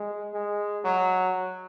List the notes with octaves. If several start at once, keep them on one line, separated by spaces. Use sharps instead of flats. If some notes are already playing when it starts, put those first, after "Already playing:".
Already playing: G#3
G#3
F#3